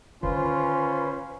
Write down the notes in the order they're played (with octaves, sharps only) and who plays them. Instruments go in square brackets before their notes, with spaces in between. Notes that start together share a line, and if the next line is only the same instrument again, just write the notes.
[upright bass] D3 D#3 [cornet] C#4 [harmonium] F4 [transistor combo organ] B4 C5